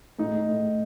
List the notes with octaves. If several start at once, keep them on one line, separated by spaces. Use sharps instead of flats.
A2 D#4
A2